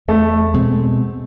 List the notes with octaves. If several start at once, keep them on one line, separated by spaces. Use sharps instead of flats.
E2 A3
B2 G#3 C4